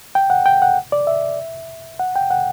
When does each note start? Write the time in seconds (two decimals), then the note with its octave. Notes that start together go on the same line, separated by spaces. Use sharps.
0.15 G5
0.30 F#5
0.46 G5
0.62 F#5
0.92 D5
1.07 E5
1.99 F#5
2.16 G5
2.31 F#5